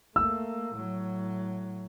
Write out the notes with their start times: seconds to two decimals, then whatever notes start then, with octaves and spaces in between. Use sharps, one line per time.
0.16 A3 A#3 E6
0.74 A2 F#3